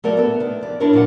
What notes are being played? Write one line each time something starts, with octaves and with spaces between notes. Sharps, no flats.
F#3 A3 A#4 D5
B3 A4
D#3
F2 D5
D4 E4 A#4 C#5
A#2 F#3 F4 F#5